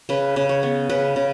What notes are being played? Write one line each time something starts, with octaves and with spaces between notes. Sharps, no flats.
C#3 B4
C#3
C#5
B3
C#3 B4
C#3